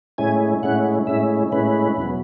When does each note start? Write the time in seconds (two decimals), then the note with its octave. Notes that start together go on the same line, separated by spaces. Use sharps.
0.18 A2 G#3 C#4 E4 G#5
0.63 A2 G#3 C#4 E4 F#5
1.07 A2 G#3 C#4 E4 E5
1.52 A2 G#3 C#4 E4 B4
1.97 E2 B2 F#3